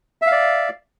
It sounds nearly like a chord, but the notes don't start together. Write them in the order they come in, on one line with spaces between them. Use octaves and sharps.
E5 F5 D5